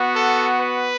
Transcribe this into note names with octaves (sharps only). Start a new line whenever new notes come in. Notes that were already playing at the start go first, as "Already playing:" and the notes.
Already playing: B3 F#4
A4
B4